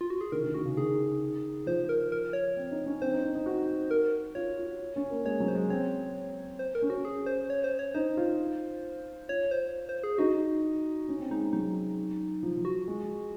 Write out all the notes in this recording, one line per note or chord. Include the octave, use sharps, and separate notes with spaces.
F4
F#4
G#4
D#3 A#4
D#3
D#3 F#4
C#3
D#3 G#4
F3 C5
A#4
A#4
C#5
C4
D#4
C#4
C4 C5
D#4
D#4
D#4
F#4
A#4
F4 C#5
F4
C#4
A#3
G#3 C#5
F#3
C5
G#3
C4 C#5
C5
A#4
C#4
F#4
G#4
C5
C#5
C5
C#5
D#4 C5
F4
F4 C#5
C5
C5
G#4
D#4 F#4
C#4
C4
G#3 D#4
G#3
F#3 D#4
F3
F3
F#4
G#3